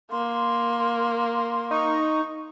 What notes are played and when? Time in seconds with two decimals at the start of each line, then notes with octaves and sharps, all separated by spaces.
0.11 A#3 C6
1.71 D#4 C#6